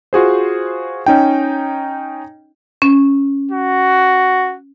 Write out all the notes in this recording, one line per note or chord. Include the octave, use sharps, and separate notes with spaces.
F4 F#4 G#4 C5
C#4 D#4 G5
C#4
F#4